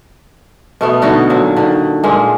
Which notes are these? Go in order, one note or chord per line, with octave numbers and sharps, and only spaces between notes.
B2 A3 B3
B2 D3 D#4 F#4
A#2 F#3
D3 D#3
A#2 G#3 A#3